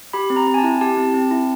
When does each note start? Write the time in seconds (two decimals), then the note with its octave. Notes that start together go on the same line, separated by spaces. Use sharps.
0.13 G4 B5
0.30 C4
0.36 A#5
0.47 C4
0.54 G#5
0.58 A5
0.64 E4
0.81 G4 A5
0.97 C4
1.14 C4
1.31 E4